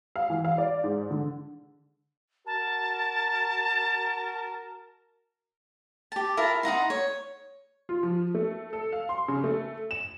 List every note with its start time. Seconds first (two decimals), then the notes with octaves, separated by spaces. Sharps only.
0.16 F5
0.30 E3
0.45 F5
0.58 D5
0.84 G#2
1.11 D3
2.46 F#4 A#4 A5
6.12 G4 A5
6.37 E4 F4 A#4 A5
6.63 D#4 F#5 A#5 C6
6.90 C#5
7.89 F4
8.03 F3
8.35 A3
8.73 A4
8.92 F5
9.09 C6
9.28 C#3
9.44 A3
9.91 E7